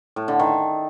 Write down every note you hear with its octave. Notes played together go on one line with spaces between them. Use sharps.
A2
D3
D#3